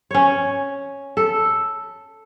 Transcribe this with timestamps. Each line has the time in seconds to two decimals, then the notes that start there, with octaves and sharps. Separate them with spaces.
0.11 C#4 C#5
1.17 A4